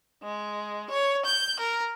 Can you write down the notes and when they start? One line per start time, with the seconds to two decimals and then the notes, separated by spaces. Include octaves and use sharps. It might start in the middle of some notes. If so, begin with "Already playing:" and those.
0.24 G#3
0.90 C#5
1.25 G6
1.60 A#4